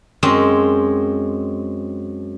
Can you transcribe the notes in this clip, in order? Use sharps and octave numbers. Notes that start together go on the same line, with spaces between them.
F#2 G#3 C4